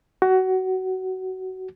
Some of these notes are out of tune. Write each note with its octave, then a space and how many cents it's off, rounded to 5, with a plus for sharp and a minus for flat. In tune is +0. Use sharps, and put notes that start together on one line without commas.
F#4 +20